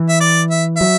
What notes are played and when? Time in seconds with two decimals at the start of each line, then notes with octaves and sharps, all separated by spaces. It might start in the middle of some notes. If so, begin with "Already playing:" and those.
Already playing: E3
0.09 E5
0.21 D5
0.50 E5
0.77 F#3 E5